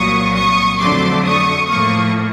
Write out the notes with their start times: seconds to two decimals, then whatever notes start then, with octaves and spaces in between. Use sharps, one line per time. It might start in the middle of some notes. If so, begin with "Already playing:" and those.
Already playing: C2 A#2 F#3 C#6 D#6
0.34 C#6 D#6
0.79 F2 D3 F#3 A3 C6 D6
1.24 C#6 D#6
1.69 A2 F3 A#3 C#6 D#6